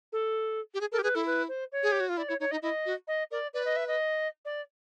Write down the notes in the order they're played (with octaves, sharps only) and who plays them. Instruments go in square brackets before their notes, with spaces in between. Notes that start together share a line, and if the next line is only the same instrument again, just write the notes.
[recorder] A4
[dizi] G4
G#4
[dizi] A4 [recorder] A#4
[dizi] G4
[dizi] G#4 [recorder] B4
[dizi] E4 [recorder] A4
[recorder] B4
C5
C#5
[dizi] G#4
G4
F#4
F4
[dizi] E4 [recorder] D5
[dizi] E4 [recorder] C#5
[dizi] D#4 [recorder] C#5
[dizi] D#4 [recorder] D#5
[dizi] E4 [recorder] D#5
[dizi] F#4
[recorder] D#5
[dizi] A#4 [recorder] D5
[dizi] B4 [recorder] D5
[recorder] D#5
E5
D#5
D5